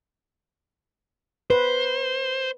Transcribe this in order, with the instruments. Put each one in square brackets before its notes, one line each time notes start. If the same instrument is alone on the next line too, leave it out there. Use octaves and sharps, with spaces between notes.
[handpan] B4 [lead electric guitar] C5